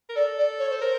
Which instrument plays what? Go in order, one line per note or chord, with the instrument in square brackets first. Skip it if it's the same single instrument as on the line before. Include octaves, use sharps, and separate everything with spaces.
[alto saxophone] A#4
[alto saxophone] A4 [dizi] D5
[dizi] D5
C#5
C5
[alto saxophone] A#4